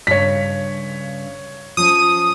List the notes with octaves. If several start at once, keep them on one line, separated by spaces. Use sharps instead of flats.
G2 A#2 C#3 C#5 B6
F3 C#4 D#6 D#7